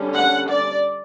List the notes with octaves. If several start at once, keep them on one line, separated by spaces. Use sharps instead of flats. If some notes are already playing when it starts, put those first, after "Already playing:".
Already playing: D3 G3 C#4
F#5
D5